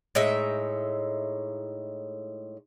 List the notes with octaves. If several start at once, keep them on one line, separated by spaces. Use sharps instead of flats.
A2 G#3 D#4 E5